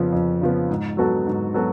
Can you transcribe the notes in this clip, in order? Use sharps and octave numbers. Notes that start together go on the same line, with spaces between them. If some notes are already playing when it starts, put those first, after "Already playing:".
Already playing: F2 C#3 F3 B3
F2
C#3 F3 B3
G#2
F#3 B3 F#4 A4
G#2
F#3 B3 F#4 A4